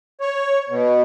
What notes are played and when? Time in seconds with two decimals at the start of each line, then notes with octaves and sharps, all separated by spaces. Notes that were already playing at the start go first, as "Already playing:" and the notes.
0.21 C#5
0.69 B2